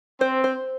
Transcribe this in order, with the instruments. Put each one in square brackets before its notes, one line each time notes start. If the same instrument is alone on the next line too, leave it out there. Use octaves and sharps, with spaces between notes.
[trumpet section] C4 [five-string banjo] C5
[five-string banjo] C5